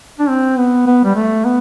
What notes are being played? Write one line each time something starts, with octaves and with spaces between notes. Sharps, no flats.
D4
C4
B3
B3
G3
A3
B3